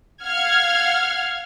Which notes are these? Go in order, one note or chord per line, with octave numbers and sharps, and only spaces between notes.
F5 F#5 F6 G#6